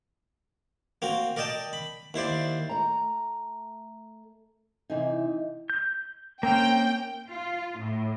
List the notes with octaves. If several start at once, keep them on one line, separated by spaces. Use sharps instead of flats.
A#3 C4 F#4
A#4 D5 D#5 G5 A5
B5
D#2 E4 C5 D5
A3 A#5
C3 E3 D#4
G6
A#3 C4 C#4 G5
F4
A2